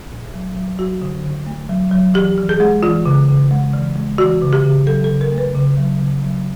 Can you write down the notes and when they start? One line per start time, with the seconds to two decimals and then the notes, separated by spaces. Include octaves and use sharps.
0.11 A#2
0.34 F#3
0.56 F#3
0.79 F#3 F#4
1.02 D3
1.24 D3
1.46 A3
1.69 F#3
1.92 F#3
2.14 E3 G4
2.38 E3
2.49 G#4
2.60 G#3
2.83 E3 F4
3.06 C#3
3.29 C#3
3.51 G#3
3.73 E3
3.96 G#3
4.18 E3 F#4
4.42 C#3
4.53 G4
4.64 C#3
4.86 F#3 A4
5.04 A4
5.10 C#3
5.21 A#4
5.32 A3
5.38 B4
5.55 C#3
5.77 F#3
6.00 C#3
6.23 F#3